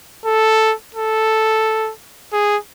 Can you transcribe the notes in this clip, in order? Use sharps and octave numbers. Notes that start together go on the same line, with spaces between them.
A4
A4
G#4